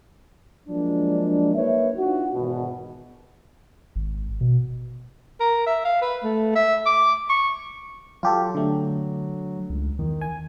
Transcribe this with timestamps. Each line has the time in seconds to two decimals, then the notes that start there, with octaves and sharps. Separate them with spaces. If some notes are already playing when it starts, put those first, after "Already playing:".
0.69 F3 F#3 G#3 A#3 D4
1.56 A#3 D#4 B4 C#5 E5
1.97 D4 D#4 F4 F#4
2.35 G#1 E2 B2
3.96 G#1
4.41 B2
5.40 A#4
5.66 E5
5.85 F5
6.02 B4
6.23 A3
6.55 E5
6.86 D6
7.29 C#6
8.23 F#3 F4 G4 A4
8.55 D3 A3
9.70 C#2
9.99 E2 D#3
10.21 G#5